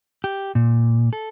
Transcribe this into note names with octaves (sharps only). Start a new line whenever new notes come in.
G4
A#2
A4